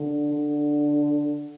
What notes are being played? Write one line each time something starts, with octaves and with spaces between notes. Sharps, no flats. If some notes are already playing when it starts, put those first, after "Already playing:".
Already playing: D3
D3